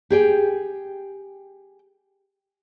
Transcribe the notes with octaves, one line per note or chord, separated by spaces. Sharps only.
G4 G#4 G5